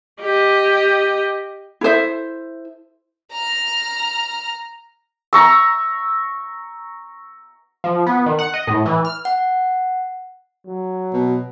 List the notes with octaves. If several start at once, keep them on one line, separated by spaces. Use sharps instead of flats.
G4 D#5
E4 A4 C5 E5
A#5 F6
A#5 C#6 E6
F3
B3
D#3
F#5
D#5
A2
E3
F6
F#5
F#3
B2